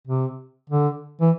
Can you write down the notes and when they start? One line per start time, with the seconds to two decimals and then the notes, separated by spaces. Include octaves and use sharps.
0.08 C3
0.70 D3
1.21 E3